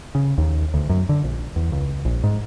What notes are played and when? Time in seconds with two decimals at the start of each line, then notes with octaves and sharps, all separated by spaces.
0.15 C#3
0.38 D#2
0.74 D2
0.90 F#2
1.09 D3
1.24 A#1
1.56 E2
1.72 C#2
2.05 A#1
2.24 G#2